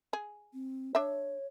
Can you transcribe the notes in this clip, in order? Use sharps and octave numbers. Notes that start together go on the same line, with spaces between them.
G#4
C4
D4 C#5 E5